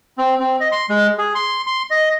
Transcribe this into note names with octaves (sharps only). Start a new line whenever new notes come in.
C4
C4
D#5
C6
G#3
G#4
C6
C6
D#5